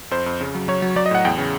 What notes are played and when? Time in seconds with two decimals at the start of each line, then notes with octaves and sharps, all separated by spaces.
0.11 F2 C5
0.26 F2
0.41 C#3
0.55 F#3
0.68 F#3 C#5
0.82 F#3
0.96 F#3 D5
1.06 D#5
1.11 A2 F#5
1.25 E2 G5
1.38 C#3